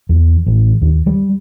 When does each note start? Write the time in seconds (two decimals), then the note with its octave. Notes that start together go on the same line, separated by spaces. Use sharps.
0.09 E2
0.47 A1
0.81 D#2
1.06 G3